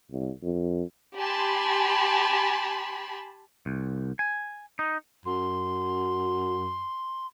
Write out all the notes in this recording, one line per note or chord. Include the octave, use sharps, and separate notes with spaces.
C2
F2
G4 G#5 A5 B5 C6
C2
G#5
D#4
F#2 C6